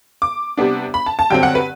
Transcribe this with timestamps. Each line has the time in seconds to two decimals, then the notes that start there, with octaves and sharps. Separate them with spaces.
0.22 D6
0.57 C3 G3 B3 D4
0.94 B5
1.06 A5
1.19 A5
1.30 G2 D3 F#3 C4 G5
1.43 F#5
1.55 B4